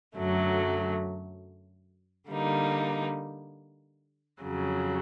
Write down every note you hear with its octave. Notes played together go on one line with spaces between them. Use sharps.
F#2 D3 F#3 A3
D3 G3 A#3 D#4
F2 C#3 F#3